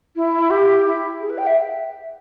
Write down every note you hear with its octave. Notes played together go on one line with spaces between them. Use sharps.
E4
G4
E4
G#4
B4
G5
E5